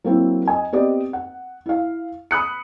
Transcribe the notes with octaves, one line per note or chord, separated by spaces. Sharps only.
F#3 A#3 C4 E4
D#5 G#5
B3 C4 G4 B4 D5 D#5
F#5
E4 F5
B5 D#6 F#6 C#7